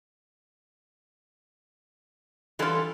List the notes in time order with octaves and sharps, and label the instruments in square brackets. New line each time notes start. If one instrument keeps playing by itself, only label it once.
[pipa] D3 F4 [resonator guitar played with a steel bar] E3 G3 A4